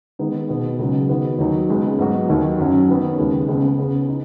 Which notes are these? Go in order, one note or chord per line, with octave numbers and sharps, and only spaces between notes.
D#3 G#3 B3 D#4
B2 B3 F#4
C#2 C#3 F#3 D#4
D#3 B3 F#4
D#2 D#3 F#3 D#4 F#4
C#2 C#3 G#3 B3
G#2 F#3 B3 D#4 F#4
D#2 D#3 F#3
F#2 F#3 C#4
D#3 B3 F#4
D#2 C#3 G#3 B3
C#2 C#3 B3
C#3 B3 G#4
D#4